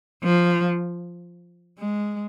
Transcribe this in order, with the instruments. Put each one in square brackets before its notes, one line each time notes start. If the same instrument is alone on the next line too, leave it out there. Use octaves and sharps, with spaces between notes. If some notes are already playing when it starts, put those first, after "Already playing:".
[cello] F3
G#3